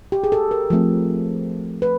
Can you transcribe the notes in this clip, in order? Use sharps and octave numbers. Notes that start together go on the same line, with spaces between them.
G4
G#4
A4
A#4
F3 A3 C4
B4